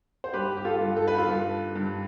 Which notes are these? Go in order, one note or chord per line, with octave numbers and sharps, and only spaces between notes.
C5
G2 G4 B4
G4
F4 A4
G2
A4
B4
F4 A4
G2
G2